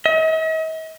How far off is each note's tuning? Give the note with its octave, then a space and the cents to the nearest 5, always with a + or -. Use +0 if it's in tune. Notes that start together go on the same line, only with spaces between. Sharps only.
D#5 +45